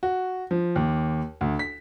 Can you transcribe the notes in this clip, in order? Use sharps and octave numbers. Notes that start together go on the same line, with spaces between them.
F#4
F3
D#2
D2
B6